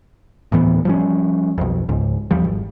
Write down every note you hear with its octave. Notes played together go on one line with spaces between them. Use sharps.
D2 A2 E3 B3
F3 G3 C#4
B1 F2
C#2 G#2
E2 F3 G3
G#1